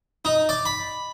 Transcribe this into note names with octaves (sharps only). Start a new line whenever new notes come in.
D#4
D5
B5